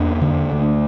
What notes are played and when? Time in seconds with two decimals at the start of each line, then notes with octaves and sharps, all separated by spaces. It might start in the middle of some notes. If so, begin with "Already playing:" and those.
Already playing: E2 A#3 D4
0.22 D3
0.52 D2